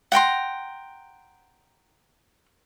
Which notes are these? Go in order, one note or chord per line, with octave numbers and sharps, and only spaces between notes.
F#5 G5 A#5 C6